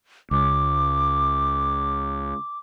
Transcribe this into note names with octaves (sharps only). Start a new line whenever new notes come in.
C#2 D6